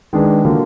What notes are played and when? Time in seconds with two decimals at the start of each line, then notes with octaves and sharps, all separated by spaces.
0.13 D#3 G#3 D4 G#4 B4
0.45 D3 F#3 A#3 F4